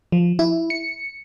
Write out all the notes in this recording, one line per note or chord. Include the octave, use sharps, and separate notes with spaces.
F3
E4
C#7